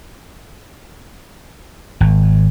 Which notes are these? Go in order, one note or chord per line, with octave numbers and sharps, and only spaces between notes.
G#1